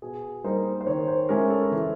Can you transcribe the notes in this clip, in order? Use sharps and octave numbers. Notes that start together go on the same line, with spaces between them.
B2 G#4
G3 A#3 D#4 C5
C5
D#3 C#5
C5
G#3 C#4 E4 G4 A#4
A4
E3